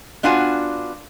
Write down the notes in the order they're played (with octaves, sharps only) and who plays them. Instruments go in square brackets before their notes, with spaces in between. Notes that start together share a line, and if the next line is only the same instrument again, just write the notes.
[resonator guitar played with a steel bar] B3 D4 F4 F#4 G#5